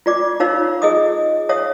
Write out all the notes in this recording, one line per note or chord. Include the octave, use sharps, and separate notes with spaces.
F4 D5 D6
D#4 F4 C#5 F5 E6
G#4 D#5 D#6
C#5 E5 F5 D#6